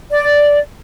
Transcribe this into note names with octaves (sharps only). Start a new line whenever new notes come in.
D5